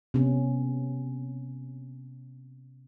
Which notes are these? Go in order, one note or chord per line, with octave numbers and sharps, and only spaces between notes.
C3 B3 C#4